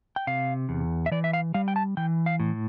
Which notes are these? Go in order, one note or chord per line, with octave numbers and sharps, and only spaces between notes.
G5
C3 F5
E2
E5
E3 D5
E5
F5
G3 F5
G5
A5
E3 G5
F5
A2